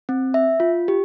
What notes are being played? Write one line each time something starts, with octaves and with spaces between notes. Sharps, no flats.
C4
E5
F4
G4